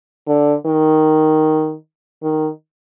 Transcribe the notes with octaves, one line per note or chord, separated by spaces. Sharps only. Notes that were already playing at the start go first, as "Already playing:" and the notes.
D3
D#3
D#3